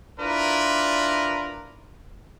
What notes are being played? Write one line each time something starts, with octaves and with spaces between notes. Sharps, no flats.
D4 E4 F4 A#4 B4